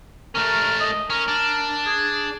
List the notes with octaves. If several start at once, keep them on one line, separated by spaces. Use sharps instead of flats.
A3 C#4 A#4
D#5
C#4 A#4
D4
G#4